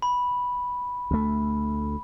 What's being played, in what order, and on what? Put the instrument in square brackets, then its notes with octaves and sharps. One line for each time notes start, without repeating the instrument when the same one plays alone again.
[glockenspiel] B5
[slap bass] D2 A3